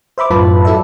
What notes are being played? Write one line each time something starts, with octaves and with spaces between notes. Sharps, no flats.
C5 E5 B5 D6
F#2 A2 F4 B4 A5 B5
F#3 E4 A4 D5 E5